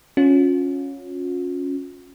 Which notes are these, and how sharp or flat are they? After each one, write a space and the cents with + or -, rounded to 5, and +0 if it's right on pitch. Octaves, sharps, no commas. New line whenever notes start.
C#4 +0 F4 +40